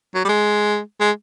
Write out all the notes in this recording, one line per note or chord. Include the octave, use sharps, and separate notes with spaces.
F#3
G3
G#3
G#3